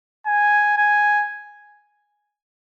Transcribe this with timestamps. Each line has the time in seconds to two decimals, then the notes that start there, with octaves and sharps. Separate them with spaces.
0.26 G#5
0.78 G#5